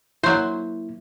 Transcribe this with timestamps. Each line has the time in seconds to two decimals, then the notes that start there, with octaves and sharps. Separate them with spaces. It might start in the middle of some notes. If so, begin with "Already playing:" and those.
0.23 F#3 A#3 E4 C5